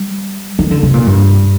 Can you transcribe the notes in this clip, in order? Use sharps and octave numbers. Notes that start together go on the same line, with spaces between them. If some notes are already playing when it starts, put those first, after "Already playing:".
Already playing: G3
D#3
D3
C3
A#2
G2